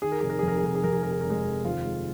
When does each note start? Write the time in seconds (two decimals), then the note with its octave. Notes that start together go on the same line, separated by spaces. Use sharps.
0.02 D#3 G#4
0.12 A#4
0.20 F1 G#4
0.30 A#4
0.39 F2 G#4
0.48 A#4
0.57 G#4
0.63 F1 A#4
0.75 G#4
0.84 F2 A#4
0.93 G#4
1.03 F1 A#4
1.12 G#4
1.21 F1 A#4
1.30 G#3 G#4
1.45 F1
1.64 D#2 F3 F4
1.85 G#3